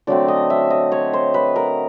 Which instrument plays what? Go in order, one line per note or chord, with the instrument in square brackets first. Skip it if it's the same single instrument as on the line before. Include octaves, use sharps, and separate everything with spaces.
[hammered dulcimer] D3 F#3 A3 C4 D5
D#5
E5
D#5
C#5
C5
B4
A#4